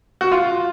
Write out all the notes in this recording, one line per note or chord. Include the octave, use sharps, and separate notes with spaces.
F#4
F4